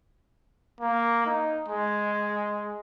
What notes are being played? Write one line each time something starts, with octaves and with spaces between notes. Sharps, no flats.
A#3
D#4
G#3